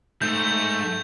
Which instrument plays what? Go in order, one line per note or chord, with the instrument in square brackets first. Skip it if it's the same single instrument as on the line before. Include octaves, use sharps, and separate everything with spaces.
[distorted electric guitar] G#2 [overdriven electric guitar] A3 [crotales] G6